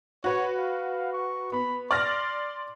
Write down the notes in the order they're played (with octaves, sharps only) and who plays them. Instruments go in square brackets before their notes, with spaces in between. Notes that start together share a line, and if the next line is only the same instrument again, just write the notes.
[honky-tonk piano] F#4 B4 [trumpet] C#5
[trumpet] F5
C#6
[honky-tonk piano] B3 [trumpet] B5
[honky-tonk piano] D5 F6 A#6 [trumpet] C6